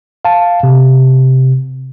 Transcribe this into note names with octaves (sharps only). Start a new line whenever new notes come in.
F5 A5
C3